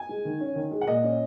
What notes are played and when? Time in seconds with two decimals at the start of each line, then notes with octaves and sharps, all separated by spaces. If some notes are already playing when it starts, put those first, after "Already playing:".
Already playing: G#5
0.09 G#3
0.25 D#3
0.40 C#4
0.56 D#3
0.71 G#3
0.81 F#5
0.87 A#2 D#5
1.04 C#4